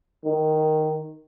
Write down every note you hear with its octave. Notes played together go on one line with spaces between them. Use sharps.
D#3